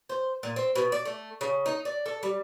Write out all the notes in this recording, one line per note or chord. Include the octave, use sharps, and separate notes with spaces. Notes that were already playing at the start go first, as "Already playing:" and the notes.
C5
A#2
C4
B2
D5
A3
C#3
D#4
D5
A4
G3